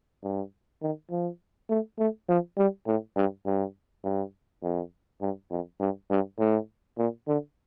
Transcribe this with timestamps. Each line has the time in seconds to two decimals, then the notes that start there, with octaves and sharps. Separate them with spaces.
0.23 G2
0.82 D#3
1.11 F3
1.70 A3
1.98 A3
2.29 F3
2.58 G3
2.87 A2
3.16 G2
3.46 G2
4.04 G2
4.63 F2
5.21 G2
5.51 F2
5.80 G2
6.10 G2
6.39 A2
6.98 A#2
7.28 D3